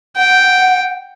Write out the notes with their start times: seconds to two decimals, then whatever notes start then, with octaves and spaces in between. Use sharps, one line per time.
0.17 F#5 G5